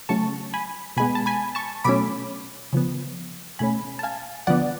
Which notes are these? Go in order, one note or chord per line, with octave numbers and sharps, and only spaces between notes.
C#3 F#3 A3 C#4 A5 C#6
G#5 B5
B2 G#3 B3 G#5 B5
A5
G#5 B5
A5 C#6
B2 F#3 A3 C#4 B5 D6
C#3 F3 B3
B2 A3 C#4 G#5 B5
A5
F5 G#5
D3 F3 B3 D5 F#5